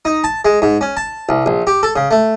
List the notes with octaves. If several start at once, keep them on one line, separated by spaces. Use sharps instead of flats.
D#4
A5
G#3
G#2
C#4
A5
C2
A#1
G4
A4
C#3
A3